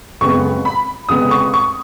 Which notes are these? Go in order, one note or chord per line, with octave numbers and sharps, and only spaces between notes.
F#1 F2 C#3 G#3 B3 C#6
B5
F1 F2 C#3 G#3 B3 D#6
C#6
C#6